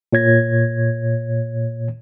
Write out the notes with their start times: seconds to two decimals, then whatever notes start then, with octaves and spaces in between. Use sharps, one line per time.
0.13 A#2 C#5 G#6 A#6